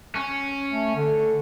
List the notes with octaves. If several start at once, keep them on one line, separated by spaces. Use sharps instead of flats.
C#4
A3
D3